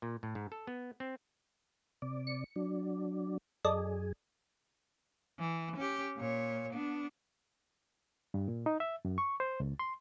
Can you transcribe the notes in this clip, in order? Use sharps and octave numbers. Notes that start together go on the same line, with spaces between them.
A#2
A2
G#2
A4
B3
C4
C3 D5
C#7
F#3 D4
F#2 G#4 A4 D5 D#5
E3
C#4 G4
A#2 C#5
B3 D4
G2
A#2
D#4
E5
F#2
C#6
C5
C#2
C6